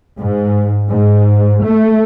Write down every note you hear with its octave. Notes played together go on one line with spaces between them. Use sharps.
G#2
G#2
A3